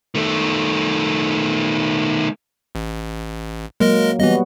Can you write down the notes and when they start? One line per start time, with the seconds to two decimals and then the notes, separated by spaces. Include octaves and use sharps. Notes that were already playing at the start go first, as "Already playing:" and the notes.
0.15 D#3 A3
2.75 A1
3.80 F#3 G#3 A#3 A#4 D#5
4.19 E3 G3 B3 F#4 D#5